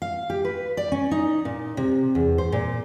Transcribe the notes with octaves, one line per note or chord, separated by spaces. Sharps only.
F5
G4
B4
D5
C#4
D#4
A#2
C3
E2
C5
A#2